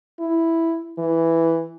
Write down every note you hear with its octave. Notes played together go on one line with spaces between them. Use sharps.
E4
E3